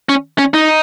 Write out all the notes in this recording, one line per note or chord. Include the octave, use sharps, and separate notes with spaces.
C#4
C#4
D#4